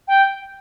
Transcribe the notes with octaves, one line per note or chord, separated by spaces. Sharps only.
G5